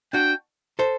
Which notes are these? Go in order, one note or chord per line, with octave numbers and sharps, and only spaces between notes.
D4 F#4 G5
A4 C5